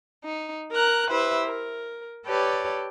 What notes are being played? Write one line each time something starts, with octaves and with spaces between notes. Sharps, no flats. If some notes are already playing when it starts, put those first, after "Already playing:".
D#4
A#4 A#5 F#6
E4 G4 B4 C5 E5
A#4
G4 A4 B4 C#5 D5